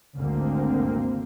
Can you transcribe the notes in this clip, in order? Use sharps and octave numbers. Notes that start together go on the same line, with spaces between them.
G#1 D2 D3 A#3 C4